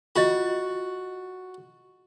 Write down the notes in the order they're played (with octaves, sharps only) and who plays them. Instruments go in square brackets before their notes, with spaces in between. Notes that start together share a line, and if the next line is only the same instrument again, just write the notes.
[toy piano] F4 D#5 [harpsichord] F#4